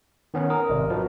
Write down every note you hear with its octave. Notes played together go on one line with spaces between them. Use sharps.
D#3 B3 C#4
A#4 D#6
G#1 C3 D5
F3 F#3 F#4 B4